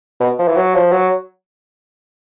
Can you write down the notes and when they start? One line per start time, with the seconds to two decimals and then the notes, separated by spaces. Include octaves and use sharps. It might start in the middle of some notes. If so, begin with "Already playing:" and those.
0.20 B2
0.39 F3
0.48 E3
0.57 F#3
0.75 F3
0.92 F#3